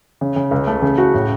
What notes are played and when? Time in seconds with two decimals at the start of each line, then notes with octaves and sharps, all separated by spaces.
0.21 C#3
0.36 C#3
0.51 C#2
0.67 A3
0.82 C#3
0.98 F#4
1.14 A2